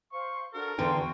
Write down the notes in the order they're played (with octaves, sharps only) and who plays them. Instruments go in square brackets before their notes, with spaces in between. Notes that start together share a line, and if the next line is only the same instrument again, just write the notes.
[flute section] C5 F5 C6 [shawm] C#6
[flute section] D4 F#4 A4 [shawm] A#4
[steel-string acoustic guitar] E2 D3 G5 [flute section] F5 A#5 C6
[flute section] F#4